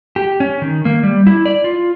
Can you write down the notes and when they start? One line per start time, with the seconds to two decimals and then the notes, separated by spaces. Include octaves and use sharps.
0.16 G4
0.40 C#4
0.62 D#3
0.85 A#3
1.03 G3
1.27 E4
1.46 D5
1.64 F4